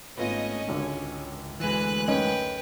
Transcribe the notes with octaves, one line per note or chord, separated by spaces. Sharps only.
G#1 A3 B3 C#4 F4 D#5
G#1 C#2 D3
D2 E3 G#3 B4 F#6
F#2 C#4 D#4 B4 G5